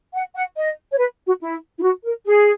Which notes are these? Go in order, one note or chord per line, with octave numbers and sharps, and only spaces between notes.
F#5
F#5
D#5
C#5
B4
F#4
E4
E4
F#4
A#4
G#4